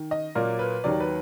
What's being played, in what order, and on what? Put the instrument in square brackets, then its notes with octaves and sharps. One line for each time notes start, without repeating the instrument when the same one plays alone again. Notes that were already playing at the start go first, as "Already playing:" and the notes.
Already playing: [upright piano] D#3
D#5
A#2 F#3 A#3 D5
B4
D#2 D#3 F#3 D5
B4